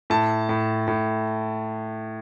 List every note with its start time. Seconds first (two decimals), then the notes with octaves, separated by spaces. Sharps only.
0.10 A2 A5
0.49 A2
0.88 A2